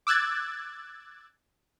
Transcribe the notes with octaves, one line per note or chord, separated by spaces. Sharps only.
D6 E6 F#6 G#6 A6